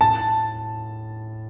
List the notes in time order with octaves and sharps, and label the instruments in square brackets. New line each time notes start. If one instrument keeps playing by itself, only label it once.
[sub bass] A2 [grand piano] A5